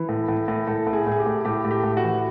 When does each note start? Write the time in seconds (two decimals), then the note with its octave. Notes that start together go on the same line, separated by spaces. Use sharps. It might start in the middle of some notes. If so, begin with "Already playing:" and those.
Already playing: E3
0.09 A2
0.28 A2
0.48 A2
0.67 A2 A4
0.87 A2
0.93 G#4
1.07 A2
1.12 G#4
1.19 G4
1.26 A2
1.45 A2 G4
1.65 A2
1.71 G4
1.84 A2
1.97 F#4
2.04 E3